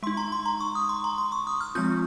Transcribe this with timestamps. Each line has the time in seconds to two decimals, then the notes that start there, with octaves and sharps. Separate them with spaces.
0.03 G#3 C6
0.07 D#4
0.17 A#5
0.32 C6
0.45 A#5
0.60 C#6
0.75 D#6
0.89 C6
1.04 A#5
1.18 C6
1.32 C#6
1.47 D#6
1.61 F6
1.75 F3 G#3 C4 F4 G6